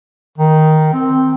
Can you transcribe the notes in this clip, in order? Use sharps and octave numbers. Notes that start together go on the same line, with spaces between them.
D#3
C4